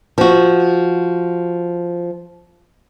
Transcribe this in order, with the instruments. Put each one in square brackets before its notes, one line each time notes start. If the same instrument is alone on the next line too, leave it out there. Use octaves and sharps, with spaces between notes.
[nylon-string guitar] F3 F#4